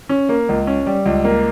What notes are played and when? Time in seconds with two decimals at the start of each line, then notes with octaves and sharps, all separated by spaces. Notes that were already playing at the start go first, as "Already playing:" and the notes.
0.09 C#4
0.29 A#3
0.49 C#2
0.67 C#4
0.86 G3
1.06 C#2
1.25 A#3